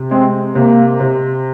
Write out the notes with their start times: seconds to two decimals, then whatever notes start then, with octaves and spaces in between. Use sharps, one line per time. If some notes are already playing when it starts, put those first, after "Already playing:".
Already playing: C3
0.11 G#3 C4
0.55 C3 A#3
1.00 C3